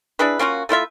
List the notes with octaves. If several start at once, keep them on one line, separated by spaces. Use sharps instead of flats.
D4 E4 G#4 B4
A#3 C#4 F4 F#4
A3 E4 F4 E5